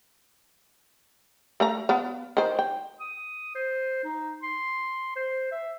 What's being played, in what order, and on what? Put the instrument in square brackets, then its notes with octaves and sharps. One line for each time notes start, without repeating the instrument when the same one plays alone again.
[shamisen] A3 F5 A#5
B3 F5
D#3 C5
G5
[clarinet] D#6
C5
D#4
C6
C5
E5